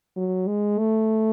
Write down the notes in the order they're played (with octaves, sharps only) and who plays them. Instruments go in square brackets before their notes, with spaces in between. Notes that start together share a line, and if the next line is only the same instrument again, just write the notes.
[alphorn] F#3
G#3
A3